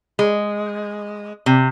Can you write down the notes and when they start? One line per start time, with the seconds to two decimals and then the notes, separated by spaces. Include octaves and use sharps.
0.19 G#3
1.46 C3